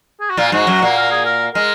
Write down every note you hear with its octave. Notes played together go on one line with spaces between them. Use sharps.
G#4
F#4
A#2 A#3 F4
G#2 G#3 F#4
F#2 F#3
A#2 A#3
A#4
G#4
A#4
G#3 A#4